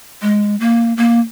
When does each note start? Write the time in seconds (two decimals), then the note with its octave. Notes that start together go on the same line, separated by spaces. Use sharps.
0.22 G#3
0.60 A#3
0.97 A#3